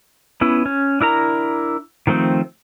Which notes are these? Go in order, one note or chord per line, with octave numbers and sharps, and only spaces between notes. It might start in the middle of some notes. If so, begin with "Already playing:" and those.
B3 C#4 E4
C#4
D4 E4 A#4 A#5
D#3 F3 A3 C4